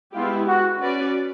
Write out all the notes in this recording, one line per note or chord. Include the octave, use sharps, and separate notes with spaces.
G#3 B3 E4 F4 G4
F#4
C#4 F#4 B4 D5